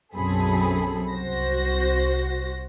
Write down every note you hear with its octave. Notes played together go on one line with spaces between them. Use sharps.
B1 F#2 C4 G#4 A4 B5
C2 F#4 C5 A#6